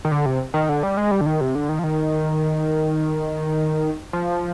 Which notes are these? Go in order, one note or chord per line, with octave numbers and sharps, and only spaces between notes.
D#3
D3
C3
D#3
D3
G3
G#3
G3
D3
D#3
C3
D3
D#3
F3
D#3
F3